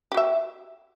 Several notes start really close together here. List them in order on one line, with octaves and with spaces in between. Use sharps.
G4 F#4 E5